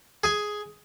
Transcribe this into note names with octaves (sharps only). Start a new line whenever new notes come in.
G#4 G#5